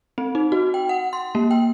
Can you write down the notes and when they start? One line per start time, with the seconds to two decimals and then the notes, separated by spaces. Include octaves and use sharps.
0.18 C4
0.35 D#4
0.52 F#4
0.74 G5
0.89 F#5
1.13 C6
1.35 A#3
1.51 G5